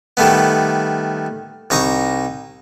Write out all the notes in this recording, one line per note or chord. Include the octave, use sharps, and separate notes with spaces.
D#3 G3 A3 B3
C2 D#4 A#5 C#6 D#6